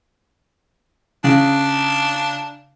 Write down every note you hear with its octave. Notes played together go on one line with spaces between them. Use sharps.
C#3 D4